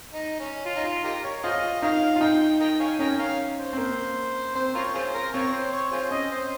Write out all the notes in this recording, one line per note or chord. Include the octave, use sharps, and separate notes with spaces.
D#4
C#4
F4
D#4
F4
D#4 G4 A#4
C#5
F4 G#4 C5 D#5
D#4 A#4 C#5 F5
F4
D#4 G5
G5
A#4 D#5 G5
C#5 F5 G#5
C#4 A#4 D#5 G5
A#4 C#5 F5
C5
C4
A#3
C4 C5
F4 A#4 C#5
F4 G#4 C5
A#4
C4 F4 A#4 C#5
C5
C#5
F4 G#4 C5
C#4 D#5
C5